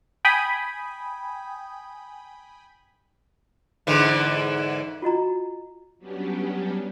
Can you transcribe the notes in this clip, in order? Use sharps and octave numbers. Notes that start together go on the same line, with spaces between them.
G5 G#5 B5 D#6
G#2 D3 E3
F4 F#4 D#5 A#5
F#3 G3 B3 C#4 D4 G4